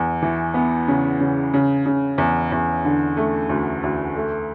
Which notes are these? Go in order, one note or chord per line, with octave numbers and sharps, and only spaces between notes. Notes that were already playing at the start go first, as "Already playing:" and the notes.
Already playing: E2
E3
B3
C#3
C#3
C#3
C#3
E2
E2
D3
A3
D2
D2
A3